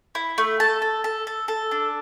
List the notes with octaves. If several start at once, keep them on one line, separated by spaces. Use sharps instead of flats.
E4
A3
A4 A5
A4
A4
A4
A4
D4